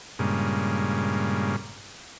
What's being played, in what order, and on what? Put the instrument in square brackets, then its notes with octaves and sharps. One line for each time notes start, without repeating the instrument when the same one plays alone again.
[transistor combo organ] G2 A#2 C#3 G#3